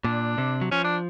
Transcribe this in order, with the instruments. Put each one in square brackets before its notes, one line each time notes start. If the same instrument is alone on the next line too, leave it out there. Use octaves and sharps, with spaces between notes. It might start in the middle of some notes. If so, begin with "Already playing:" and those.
[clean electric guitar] A#2 [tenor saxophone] D4
[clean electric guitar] C3
F#3
[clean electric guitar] F3 [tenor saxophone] C#4
[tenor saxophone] D4